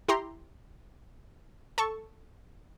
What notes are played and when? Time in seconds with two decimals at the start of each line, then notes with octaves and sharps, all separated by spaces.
0.08 E4 G4 A#5 C6
1.78 A4 A5 C#6